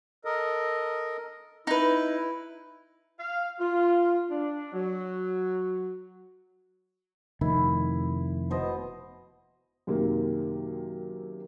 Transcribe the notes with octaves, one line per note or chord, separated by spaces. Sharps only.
A4 A#4 D#5
D#4 E4 B4
F5
F4
D4
F#3
F1 D#3 E4
B2 C5 D#5
F#2 C3 D#3 A#3